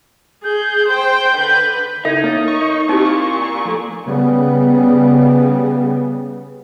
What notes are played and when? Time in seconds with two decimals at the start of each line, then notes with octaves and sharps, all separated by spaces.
0.44 G#4 G6
0.88 C5 G5 G6
1.36 D3 B4
2.05 C#3 D#4 E4 A4 E5 G#6
2.24 A#3 A#4 C#5 A6
2.48 C#6
2.89 A#2 C4 D#4 E4 G4
3.65 F3 A3 A4
4.07 C#3 G3 B3